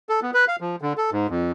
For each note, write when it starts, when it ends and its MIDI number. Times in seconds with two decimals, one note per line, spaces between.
0.09 0.20 69
0.22 0.31 59
0.34 0.45 71
0.48 0.56 77
0.60 0.76 53
0.82 0.93 50
0.97 1.10 69
1.12 1.27 44
1.30 1.52 41